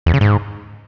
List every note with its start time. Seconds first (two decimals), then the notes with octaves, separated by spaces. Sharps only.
0.06 E2
0.14 C#3
0.21 G#2